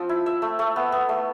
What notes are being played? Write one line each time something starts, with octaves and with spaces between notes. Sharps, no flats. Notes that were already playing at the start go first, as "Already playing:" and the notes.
Already playing: F3 C4
E4
E5
A3
A3
B3
B3
A3